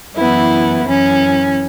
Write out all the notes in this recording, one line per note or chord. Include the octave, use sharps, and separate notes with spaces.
F#2 E3 B3 E4
F#2 E3 C#4